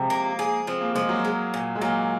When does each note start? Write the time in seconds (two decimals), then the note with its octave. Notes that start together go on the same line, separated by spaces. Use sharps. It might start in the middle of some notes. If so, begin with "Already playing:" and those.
Already playing: C3 F3 G#3
0.10 A#3
0.39 G#4
0.67 F3 C4
0.81 A#3
0.95 F3 G#3
1.09 F#3 A#3
1.24 G#3
1.54 A#2
1.75 G#3
1.81 A#2 F#3 A#3